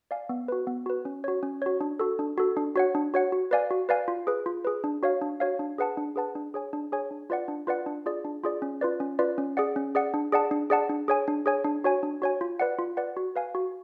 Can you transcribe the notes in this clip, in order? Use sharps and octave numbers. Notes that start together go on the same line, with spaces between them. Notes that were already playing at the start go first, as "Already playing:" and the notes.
D5 F5 G#5
B3
F#4 B4
B3
F#4 B4
C#4
F#4 C#5
C#4
F#4 C#5
D4
F#4 A4
D4
F#4 A4
D4
F#4 C#5 F#5
D4
F#4 C#5 F#5
F#4
B4 D5 F5 G#5
F#4
B4 D5 F5 G#5
F4
G#4 B4
F4
G#4 B4
D4
F#4 C#5 F5
D4
F#4 C#5 F5
D4
G#4 B4 F#5 A5
D4
G#4 B4 F#5 A5
D4
G#4 C#5 G#5
D4
G#4 C#5 G#5
D4
F4 B4 D5 F#5
D4
F4 B4 D5 F#5
D4
F4 G#4 D5
D4
F4 G#4 D5
C#4
F4 B4 D5
C#4
F4 B4 D5
C#4
G#4 D5 F#5
C#4
G#4 D5 F#5
D4
G#4 D5 F#5 A5
D4
G#4 D5 F#5 A5
D4
G#4 C#5 G#5
D4
G#4 C#5 G#5
D4
F#4 C#5 G#5
D4
F#4 C#5 G#5
F4
B4 D5 F#5
F4
B4 D5 F#5
F#4
B4 F5 G#5
F#4